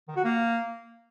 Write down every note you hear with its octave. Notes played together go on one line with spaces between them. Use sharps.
D#3
F#4
A#3